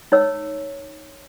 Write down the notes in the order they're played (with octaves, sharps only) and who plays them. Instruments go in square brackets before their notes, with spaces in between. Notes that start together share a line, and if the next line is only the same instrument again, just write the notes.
[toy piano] D#4 C#5 E6